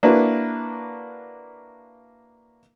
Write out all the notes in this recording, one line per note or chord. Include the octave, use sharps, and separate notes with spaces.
A#3 D4 E4 F#4 B4